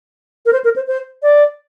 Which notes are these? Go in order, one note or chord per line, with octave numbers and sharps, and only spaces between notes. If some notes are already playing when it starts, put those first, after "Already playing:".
A#4
C5
A#4
C5
C5
D5